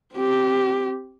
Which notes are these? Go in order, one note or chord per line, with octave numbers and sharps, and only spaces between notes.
C4 G4